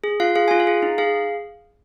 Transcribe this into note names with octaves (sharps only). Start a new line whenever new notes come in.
G#4
F4 F5
G#4 F5
F4 G#5
F5
G#4
D#4
G#4 F5